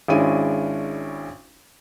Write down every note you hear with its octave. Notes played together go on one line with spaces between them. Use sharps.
G#1 G#3 C#4 D4 E4 D#7